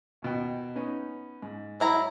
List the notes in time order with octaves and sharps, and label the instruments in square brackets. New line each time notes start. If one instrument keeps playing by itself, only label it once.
[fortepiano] D#2 B2 G5
B3 C#4 D#4
G#2
[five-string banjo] F#3 E4 A#5